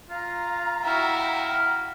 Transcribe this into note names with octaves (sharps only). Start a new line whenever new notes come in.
F4 F5 A#5
E4 F#4 F5 G5